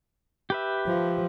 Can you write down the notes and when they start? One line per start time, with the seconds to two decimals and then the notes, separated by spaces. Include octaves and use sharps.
0.50 G4 B4 E5
0.86 F3